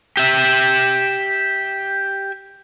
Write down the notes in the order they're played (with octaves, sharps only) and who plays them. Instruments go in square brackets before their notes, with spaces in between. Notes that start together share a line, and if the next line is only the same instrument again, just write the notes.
[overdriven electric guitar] G4 E5